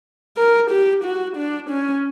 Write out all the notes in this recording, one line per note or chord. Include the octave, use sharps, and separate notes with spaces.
A#4
G4
F#4
D4
C#4